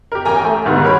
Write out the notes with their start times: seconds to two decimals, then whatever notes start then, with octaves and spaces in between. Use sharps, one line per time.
0.12 G4 A#4
0.25 A1 G5 G#5 A#5
0.45 A3
0.66 D2 G#2 D#3 G3 B3
0.84 A#4 C#5 B5